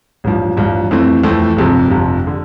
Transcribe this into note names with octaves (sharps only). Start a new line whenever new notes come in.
A1 G2 F3
A1 G2 F3
F2 E3 A3 C4
F2 E3 A3 C4
G1 F2 C3 F3
G1 F2 C3 F3
D3